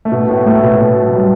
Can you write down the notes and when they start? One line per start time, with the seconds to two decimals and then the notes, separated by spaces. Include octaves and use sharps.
0.05 A3
0.12 B2 B3
0.29 A2 A3
0.46 A2 A3
0.63 B2 B3
0.76 A3
0.81 B2 B3
1.03 F#3
1.15 G3